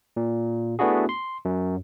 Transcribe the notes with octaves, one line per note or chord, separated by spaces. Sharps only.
A#2
A3 B3 D4 E4 F#4 G#4
C6
F#2